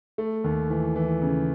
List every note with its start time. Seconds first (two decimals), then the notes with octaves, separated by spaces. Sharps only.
0.18 A3
0.44 D#2
0.70 E3
0.96 E3
1.22 C#3